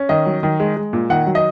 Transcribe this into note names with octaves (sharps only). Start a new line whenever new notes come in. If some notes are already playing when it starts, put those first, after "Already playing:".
Already playing: C#4
D#3 D#5
F#3
D#3
G#3
G#3
A#2
D#3 F#5
F#3
D#5